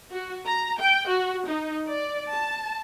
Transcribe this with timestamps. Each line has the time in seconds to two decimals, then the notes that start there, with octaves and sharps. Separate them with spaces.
0.11 F#4
0.47 A#5
0.80 G5
1.08 F#4
1.47 D#4
1.87 D5
2.32 A5